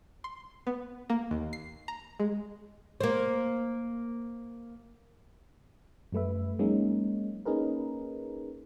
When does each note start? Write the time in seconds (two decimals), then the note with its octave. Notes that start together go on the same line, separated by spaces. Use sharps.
0.24 C6
0.67 B3
1.10 A#3
1.31 D#2
1.53 C7
1.88 A#5
2.20 G#3
3.01 A#3 C5
6.12 F#2 G3 A3 B4 E5
6.59 F#3 G#3 A#3 C#4 D#4
7.45 A#3 C#4 D#4 G#4 A#4 B4